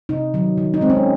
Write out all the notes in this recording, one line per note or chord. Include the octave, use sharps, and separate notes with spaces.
C3 D#4
D#3 F#3
D#3
D#4
G#3 C4
C#4